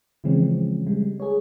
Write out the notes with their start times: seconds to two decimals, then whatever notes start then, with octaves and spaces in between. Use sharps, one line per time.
0.24 C#3 E3 F3 G#3 C4 C#4
0.87 G3 G#3
1.20 G#4 C#5